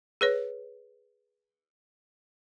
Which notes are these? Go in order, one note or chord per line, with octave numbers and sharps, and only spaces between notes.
G#4 B4 C#5